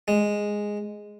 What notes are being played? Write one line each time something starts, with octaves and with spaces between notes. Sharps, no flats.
G#3